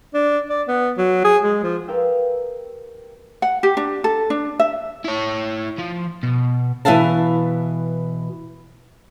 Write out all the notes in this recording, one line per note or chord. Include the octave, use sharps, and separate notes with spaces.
D4
D5
B3
F#3
G#4
G#3
F3
G4 A#4 B4 F5 G5 E6
F#5
G4
D4
A4
D4
E5
E4 C#5
F3
B2
B2 E3 B4 E5 F5 A5